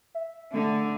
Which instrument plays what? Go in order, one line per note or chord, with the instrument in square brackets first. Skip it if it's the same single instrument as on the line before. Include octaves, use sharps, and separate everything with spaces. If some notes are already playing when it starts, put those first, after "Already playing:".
[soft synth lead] E5
[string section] D3 [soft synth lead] A3